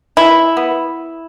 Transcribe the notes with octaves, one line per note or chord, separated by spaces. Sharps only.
E3 E4
B3